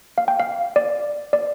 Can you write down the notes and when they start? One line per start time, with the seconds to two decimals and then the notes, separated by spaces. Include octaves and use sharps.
0.18 F5
0.28 G5
0.40 F5
0.76 D5
1.33 D5